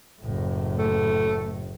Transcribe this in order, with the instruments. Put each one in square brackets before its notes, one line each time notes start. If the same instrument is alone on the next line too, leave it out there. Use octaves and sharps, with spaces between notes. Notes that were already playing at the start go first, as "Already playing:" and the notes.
[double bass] F#1 A2
[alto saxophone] A3